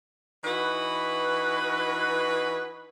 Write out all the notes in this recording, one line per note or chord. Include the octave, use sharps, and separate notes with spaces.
E3 D#4 F#4 B4